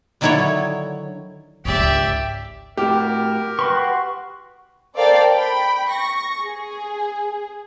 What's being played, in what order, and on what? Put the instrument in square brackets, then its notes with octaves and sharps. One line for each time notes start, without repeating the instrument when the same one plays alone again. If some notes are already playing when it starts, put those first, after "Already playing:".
[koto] D3 D#3 F#3 E4 A4 C#5
[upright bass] G#1 C#2 [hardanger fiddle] G4 [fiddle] D5 E5
[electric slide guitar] A2 F#4 [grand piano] G4 [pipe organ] A#4
[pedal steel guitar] F#4 C6 C#6 [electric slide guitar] B4
[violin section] A4 A#4 C5 D5 F5 G5
G5 B5
C#6 A#6
G#4